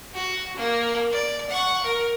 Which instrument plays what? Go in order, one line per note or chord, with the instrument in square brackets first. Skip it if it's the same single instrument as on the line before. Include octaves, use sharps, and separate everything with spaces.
[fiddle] F#4
A#3
D5
F#5 C#6
A#4